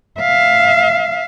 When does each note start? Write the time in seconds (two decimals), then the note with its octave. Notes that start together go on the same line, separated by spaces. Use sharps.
0.19 E5 F5